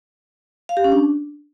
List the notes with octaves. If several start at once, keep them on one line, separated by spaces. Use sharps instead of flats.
F5
G4
C#4
D4